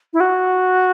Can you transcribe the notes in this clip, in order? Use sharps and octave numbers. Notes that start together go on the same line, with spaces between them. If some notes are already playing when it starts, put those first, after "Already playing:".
E4
F#4